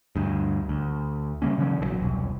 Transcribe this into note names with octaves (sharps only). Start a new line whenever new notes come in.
D2 G2
D2
C#3 G3 A#3 C#4
C#3 E3 F#3 C#4
A#1 C#3 F#3
E1 C2